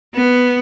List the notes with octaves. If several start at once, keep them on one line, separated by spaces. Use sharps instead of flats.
B3